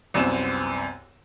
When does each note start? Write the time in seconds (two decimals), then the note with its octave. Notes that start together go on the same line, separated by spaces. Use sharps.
0.14 C2 F#2 B3 C4 E7